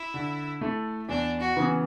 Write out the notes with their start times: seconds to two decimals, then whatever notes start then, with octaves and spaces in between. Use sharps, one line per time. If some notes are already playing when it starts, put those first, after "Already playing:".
Already playing: E4
0.14 D3
0.61 A3 E4 A4
1.09 E2 D4
1.40 F#4
1.56 C#3 E3 B3